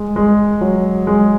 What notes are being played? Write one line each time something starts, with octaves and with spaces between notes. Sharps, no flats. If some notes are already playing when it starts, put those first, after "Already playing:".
Already playing: G#3
G#3
F#3
G#3